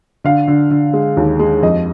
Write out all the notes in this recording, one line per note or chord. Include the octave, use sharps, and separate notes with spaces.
D3 F5
D3
D3
G#3
D#2
G#3
F2 D#5